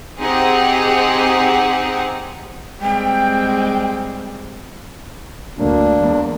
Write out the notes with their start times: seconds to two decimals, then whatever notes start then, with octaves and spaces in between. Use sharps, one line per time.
0.20 C4 D#4 G4 G#4 F#5
2.81 G3 G#3 C4 G5
5.58 D2 A#3 D4
5.98 E2 G#3